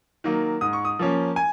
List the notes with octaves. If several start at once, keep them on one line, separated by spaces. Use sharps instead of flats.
D#3 F#3 A#3
G#2 D#6
C#6
D#6
F3 A#3 C#4
G#5